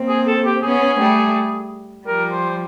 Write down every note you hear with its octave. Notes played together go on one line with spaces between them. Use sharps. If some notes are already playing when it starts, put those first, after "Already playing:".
Already playing: A#3 C4
G#4
A4
G4
B3 C#4 G#4
G3 A3
F3 G3 A#4
C5
C5